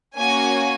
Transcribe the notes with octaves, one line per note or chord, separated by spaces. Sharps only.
A#3 C#4 F#4 G#5